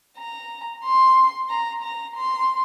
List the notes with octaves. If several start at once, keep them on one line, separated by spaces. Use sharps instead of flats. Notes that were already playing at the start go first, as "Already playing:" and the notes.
A#5
C6
A#5
A#5
C6